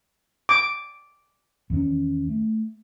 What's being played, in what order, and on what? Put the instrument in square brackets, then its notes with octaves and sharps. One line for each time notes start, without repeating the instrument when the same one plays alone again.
[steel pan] D6
[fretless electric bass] E2 D#3 C#4
A3